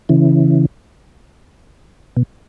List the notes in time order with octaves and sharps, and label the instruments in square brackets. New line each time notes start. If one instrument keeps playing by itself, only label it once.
[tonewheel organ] C#3 E3
B2